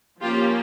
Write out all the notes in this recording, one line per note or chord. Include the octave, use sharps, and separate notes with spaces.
F3 A#3 C#4 F4 G4